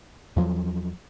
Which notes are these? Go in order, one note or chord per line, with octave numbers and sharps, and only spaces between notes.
E2 F3 F#3